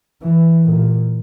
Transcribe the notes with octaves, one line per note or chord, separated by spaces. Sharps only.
E3
A#2